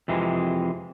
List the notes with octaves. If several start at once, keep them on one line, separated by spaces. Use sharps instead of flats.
F2 C3 E3 G#3